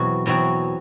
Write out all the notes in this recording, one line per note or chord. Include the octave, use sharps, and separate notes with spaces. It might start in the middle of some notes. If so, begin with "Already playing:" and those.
Already playing: E2 B2 F#3 C4 F#4
E2 B2 F#3 C4 F#4